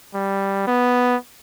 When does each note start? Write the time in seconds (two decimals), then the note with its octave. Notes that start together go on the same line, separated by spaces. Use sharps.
0.14 G3
0.67 B3